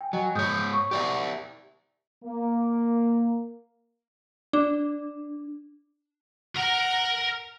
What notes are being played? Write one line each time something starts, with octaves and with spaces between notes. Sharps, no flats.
G5 G#5
F#3 D#5 G#5
G#2 C#5 D#6 G6
C#6
G4 D5 E5
A#3
D4
A#4 F#5 A#5